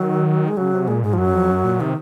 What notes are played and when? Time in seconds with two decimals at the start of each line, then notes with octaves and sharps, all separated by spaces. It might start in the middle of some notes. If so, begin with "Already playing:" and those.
Already playing: D#3 F#3
0.48 G#3
0.57 C#3 F#3
0.72 C3
0.88 A#2 G#3
1.03 G#2 G#3
1.13 F3
1.18 F#2 F#3
1.33 F2
1.50 F#2
1.64 A#2
1.80 C3 D#3